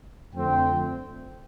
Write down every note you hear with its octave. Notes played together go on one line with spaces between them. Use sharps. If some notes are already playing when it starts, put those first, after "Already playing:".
F2 D3 A3 C4 G5